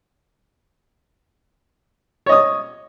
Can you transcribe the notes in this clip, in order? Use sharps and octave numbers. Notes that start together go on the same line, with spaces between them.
C#5 D#5 D#6